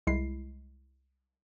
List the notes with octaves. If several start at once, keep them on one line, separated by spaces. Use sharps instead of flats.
C2 G#3 E4 C7